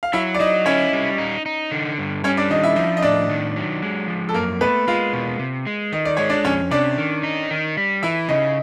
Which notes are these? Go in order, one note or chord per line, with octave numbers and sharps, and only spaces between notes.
F5
F#3 E4 E5
D5
F#3 D#4 D#5
C#4 E4 C#5
G3
D#4
D#4
D3
G2
G3 C#4 C#5
D4 D5
D#3 D#4 D#5
E4 E5
F3 D#4 D#5
D#5
A2 D4 D5
D#3
F#3
G#3
F3
A4
F#2 A#3 A#4
A3 B3 B4
G#3 F4 F5
B2
C3
G#3
D#3 D#5
D5
G#3 C#5
D4 D5
F2 C#4 C#5
C3 D4 D5
D#3
D#4
D#3
G3
E3 E4 E5
C#3 D#4 D#5